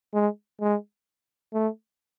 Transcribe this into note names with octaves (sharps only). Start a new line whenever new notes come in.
G#3
G#3
A3